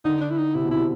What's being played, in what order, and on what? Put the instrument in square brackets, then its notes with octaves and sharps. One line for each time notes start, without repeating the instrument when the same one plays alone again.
[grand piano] D3 [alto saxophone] D#4
[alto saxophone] D4
E4
D#4
[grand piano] C3 [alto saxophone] E4
[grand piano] B2
[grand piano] C3 [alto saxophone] E4